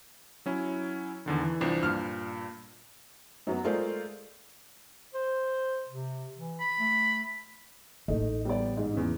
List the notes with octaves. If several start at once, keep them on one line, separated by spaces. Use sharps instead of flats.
F#3 C#4 E4
E2 D3 D#3
E3
C2 F3 D4
G2 A#2 F6
F#2 F#3 B3
G#3 A3 F4 A#4 C5 D5
C5
C3
E3
B5
A3
A1 A3 D#4
G3 B3 D5
G#2 G#3
E2 C#3